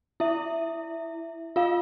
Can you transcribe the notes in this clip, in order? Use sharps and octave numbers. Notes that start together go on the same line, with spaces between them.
E4 E5
F4 F5